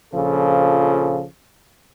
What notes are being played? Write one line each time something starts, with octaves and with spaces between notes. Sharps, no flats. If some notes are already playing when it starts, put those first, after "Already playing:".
A#1 C#3 F3 A4